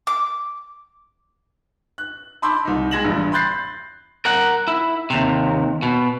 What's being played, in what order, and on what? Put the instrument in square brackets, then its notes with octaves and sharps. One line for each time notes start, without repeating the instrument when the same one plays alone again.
[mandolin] D6
[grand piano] F#6
A5 B5 C6 D6 E6 G6
C2 D#4
G#3 G#6 A#6 E7 F#7
A#1 E2 G2
B5 C6 F#6 G6 A6 C7
[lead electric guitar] A#4 F#5
E4
D#2 C3
B2